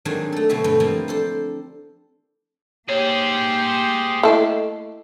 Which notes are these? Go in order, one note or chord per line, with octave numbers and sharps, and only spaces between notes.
D#3 F#3 G#3 A#3 C4 D4
A3 A4
B2 D3 F#3 C4 F#4 E5
G2 B2 A3 C4
F3 G3 A#3 C4 E4
D4 A4 C5
A#3 G4 G#4 C5 C#5
A3 E4 A4 D#5 E5